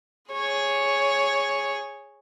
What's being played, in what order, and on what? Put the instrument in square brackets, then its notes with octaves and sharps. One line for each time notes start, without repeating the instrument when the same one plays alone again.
[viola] G#4 C#5